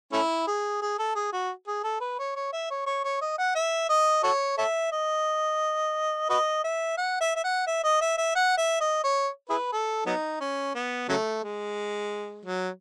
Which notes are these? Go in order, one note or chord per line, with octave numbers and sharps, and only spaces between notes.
A3 C#4 E4
G#4
G#4
A4
G#4
F#4
G#4
A4
B4
C#5
C#5
E5
C#5
C#5
C#5
D#5
F#5
E5
D#5
F#4 A4 C#5
A4 C#5 E5
D#5
F#4 B4 D#5
E5
F#5
E5
E5
F#5
E5
D#5
E5
E5
F#5
E5
D#5
C#5
E4 G#4 B4
A4
F#3 B3 D#4
C#4
B3
C#3 F#3 A3
G#3
F#3